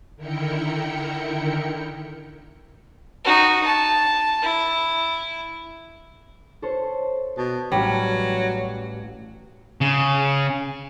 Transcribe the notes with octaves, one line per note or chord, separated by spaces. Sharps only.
D3 D#3 E4 A#4 G5 C#7
D#4 F#4
A5
E4
A4 C5 C#5
B2 A5
A1 F#3 G3 C#4
C#3